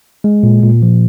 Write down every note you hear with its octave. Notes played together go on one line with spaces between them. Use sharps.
G#3
A#2
A#2
F3